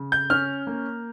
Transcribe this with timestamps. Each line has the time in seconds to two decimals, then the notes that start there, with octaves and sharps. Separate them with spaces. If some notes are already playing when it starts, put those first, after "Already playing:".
Already playing: C#3
0.12 G6
0.30 C#4 F6
0.67 A#3